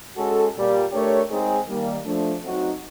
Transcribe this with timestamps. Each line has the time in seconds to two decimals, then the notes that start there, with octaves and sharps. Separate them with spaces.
0.17 G#3 C#4 F#4 A4
0.55 A#2 G3 A#3
0.92 A3 D4 G4 A#4 C#5
1.29 G#3 C4 D#4 G#4
1.67 D#3 G3 A#3
2.04 F3 A3 D4
2.42 F#3 A3 C4 D#4 F#4